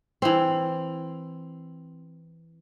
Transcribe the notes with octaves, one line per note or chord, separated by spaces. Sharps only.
E3 C4